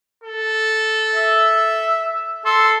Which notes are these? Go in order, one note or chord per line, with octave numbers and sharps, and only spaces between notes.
A4
E5
A4 C6